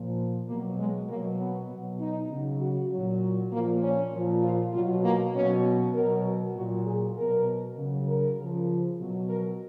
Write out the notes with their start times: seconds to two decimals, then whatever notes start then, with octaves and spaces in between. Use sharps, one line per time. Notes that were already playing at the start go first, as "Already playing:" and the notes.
Already playing: A#2 F3
0.48 B2 F#3 A#3
0.79 G#3
1.09 B2 F#3 A#3
1.40 B3
1.70 B2 F#3
2.00 D#4
2.31 C#3 F#3
2.61 F#4
2.92 A#2 F#3
3.53 A#2 F3 A#3
3.83 C#4
4.13 A#2 F3
4.43 F4
4.74 B2 F#3 F4
5.04 A#3
5.34 B2 F#3 C#4
5.95 B2 F#3 A#4
6.56 A#2 F#3 F#4
6.86 G#4
7.17 B2 F#3 A#4
7.77 C#3 F#3
8.08 A#4
8.38 C#3 F3
9.00 B2 F#3
9.29 A#4